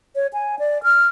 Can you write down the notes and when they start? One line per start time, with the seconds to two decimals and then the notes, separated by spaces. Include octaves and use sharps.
0.16 C#5
0.33 G#5
0.59 D5
0.83 F6